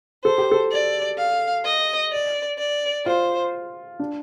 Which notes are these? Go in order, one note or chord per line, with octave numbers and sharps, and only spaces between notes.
A4 C5
G4
A4
D5
F5
D#5
D5
D5
F4 C5
D4